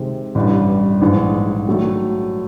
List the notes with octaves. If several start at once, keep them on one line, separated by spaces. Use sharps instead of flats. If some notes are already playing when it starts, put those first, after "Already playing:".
Already playing: C3 D#3 G#3 C4
A1 G2 E3 G3
A#1 G#2 E3
D#3 F#3 A3